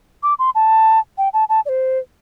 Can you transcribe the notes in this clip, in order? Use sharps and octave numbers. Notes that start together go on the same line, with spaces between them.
D6
C6
A5
G5
A5
A5
D5
C5